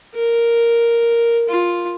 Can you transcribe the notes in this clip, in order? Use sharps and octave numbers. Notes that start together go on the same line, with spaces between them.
A#4
F4